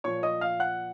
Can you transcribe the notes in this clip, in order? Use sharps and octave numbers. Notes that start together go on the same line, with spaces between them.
A#2 F3 C#5 C#6
D#5 D#6
F5 F6
F#5 F#6